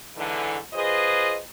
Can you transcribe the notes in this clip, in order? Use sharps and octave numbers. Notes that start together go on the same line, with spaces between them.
G#2 D3 E3
F4 G#4 B4 C5 D#5